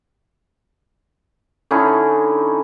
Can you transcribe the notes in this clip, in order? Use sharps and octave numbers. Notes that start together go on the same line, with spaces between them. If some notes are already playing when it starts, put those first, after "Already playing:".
D3 C#4 D#4 E4